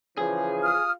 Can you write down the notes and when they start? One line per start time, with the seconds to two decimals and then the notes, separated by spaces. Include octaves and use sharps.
0.18 C#3 E3 F3 G#4
0.63 F4 D#6 F6